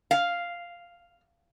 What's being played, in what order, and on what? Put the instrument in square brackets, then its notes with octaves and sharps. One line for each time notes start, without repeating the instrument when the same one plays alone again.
[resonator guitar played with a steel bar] F5